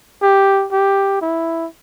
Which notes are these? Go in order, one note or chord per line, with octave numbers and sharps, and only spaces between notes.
G4
G4
E4